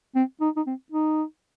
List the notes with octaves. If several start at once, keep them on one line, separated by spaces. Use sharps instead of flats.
C4
D#4
D#4
C4
D#4